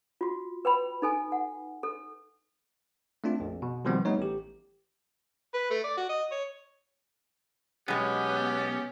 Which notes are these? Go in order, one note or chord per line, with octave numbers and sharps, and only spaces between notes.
F4 F#4
B4 G5 B5
D#4 A4 G#5
F#5
A4
A3 C4 D4 F4
A#1 F2
B2
B2 D#3 F3 G3 B3 C4
G3 A3 B3 D#4 C#5
A1 G4
B4
A3
D5
F#4
D#5
C#5
B1 B2 G#3 B3 C#4 G4